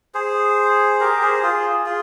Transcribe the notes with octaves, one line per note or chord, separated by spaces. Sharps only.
G#4 C5
G4 A#4
G#4 C5
F4 G#4
F4 G#4